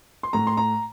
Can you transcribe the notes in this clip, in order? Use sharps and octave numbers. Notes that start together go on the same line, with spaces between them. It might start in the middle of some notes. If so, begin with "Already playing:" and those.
C6
A2 A#5
C6
A#5